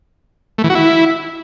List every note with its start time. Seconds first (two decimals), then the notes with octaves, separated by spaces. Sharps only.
0.58 A3
0.64 E3
0.70 F#4
0.75 E4